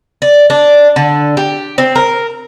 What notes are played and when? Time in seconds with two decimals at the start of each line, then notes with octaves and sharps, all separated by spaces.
0.22 D5
0.50 D4
0.96 D3
1.37 G4
1.78 C4
1.95 A#4